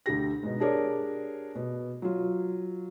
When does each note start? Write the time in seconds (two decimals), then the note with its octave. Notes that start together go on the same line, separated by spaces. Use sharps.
0.06 D2 D3 G4 A#6
0.43 G#2 B2
0.60 D4 G4 G#4 A#4 C#5 D5
1.55 B2
2.02 F#3 F4